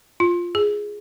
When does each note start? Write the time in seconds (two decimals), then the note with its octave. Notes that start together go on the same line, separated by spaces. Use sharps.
0.20 F4
0.55 G#4